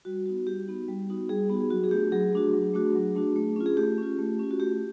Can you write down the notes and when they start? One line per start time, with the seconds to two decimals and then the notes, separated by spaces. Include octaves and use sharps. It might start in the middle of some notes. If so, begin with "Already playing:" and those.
0.05 G3 F#4
0.26 B3 D#4 F#4
0.47 G3 G4
0.68 B3 D#4 F#4
0.89 G3
1.09 B3 D#4 F#4
1.29 G3 G#4
1.50 B3 D#4 F#4 G4
1.61 G#4
1.70 F#3 F#4
1.84 G#4
1.91 A3 D4 F#4 G4
2.12 F#3 G#4
2.33 A3 D4 F#4
2.53 F#3
2.74 A3 D4 F#4
2.95 F#3
3.15 A3 D4 F#4
3.36 A3
3.56 C#4 F4
3.66 G#4
3.77 A3 G4
3.98 C#4 F4
4.19 A3
4.39 C#4 F4
4.51 F#4
4.59 A3 G4